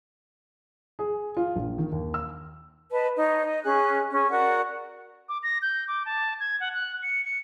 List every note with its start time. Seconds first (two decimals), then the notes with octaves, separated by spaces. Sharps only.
0.99 G#4
1.37 F4
1.56 A#1
1.78 D#3
1.92 D#2
2.14 E6
2.93 B4 D#5 A5
3.16 D#4 C#5
3.44 D#5
3.64 C#4 G#4 F#6
4.11 C#4 G#4
4.30 F#4 A#4 D5 F#5
5.29 D6
5.43 A#6
5.62 G6
5.88 D6
6.06 A5
6.40 G#6
6.60 F#5
6.75 F#6
7.03 C#7
7.25 C#7